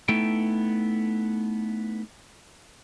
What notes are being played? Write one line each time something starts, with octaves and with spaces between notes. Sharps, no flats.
A3 B3 D#4 E4 A4 G5